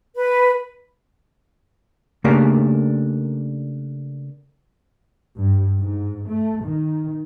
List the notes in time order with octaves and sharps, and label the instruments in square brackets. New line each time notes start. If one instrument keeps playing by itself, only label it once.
[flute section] B4
[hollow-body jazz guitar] C#3 A3 A#3 D4 G4 A#4
[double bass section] G2
G#2
A3
D#3